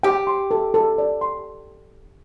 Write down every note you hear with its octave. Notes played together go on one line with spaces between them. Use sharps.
G4 G5
C6
A4
A4
D5
C6